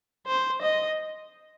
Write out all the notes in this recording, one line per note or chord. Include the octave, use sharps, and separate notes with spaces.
C5
D#5